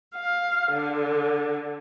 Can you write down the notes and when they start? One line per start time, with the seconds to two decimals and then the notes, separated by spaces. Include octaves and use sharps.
0.15 F5
0.73 D3